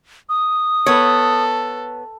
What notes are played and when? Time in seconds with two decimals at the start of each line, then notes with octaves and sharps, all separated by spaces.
0.29 D#6
0.86 B3 A4 C#5